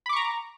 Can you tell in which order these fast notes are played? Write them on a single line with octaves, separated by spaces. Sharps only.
B5 D6 C#6 A#5